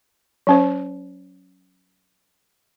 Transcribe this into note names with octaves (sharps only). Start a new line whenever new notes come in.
F#3 C#4 C5